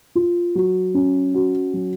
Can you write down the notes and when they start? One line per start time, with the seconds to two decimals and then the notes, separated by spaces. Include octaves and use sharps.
0.15 F4
0.55 F#3
0.94 C#4
1.34 F#4
1.73 F#3